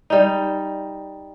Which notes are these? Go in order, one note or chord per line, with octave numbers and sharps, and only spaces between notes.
G3 D#4